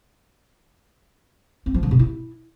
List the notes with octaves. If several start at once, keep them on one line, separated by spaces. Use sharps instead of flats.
C4
F3
D3
C3
E4